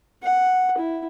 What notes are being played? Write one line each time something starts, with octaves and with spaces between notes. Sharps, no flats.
F#5
E4